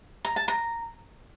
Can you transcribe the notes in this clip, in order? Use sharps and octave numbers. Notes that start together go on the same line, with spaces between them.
A#5
A5
A#5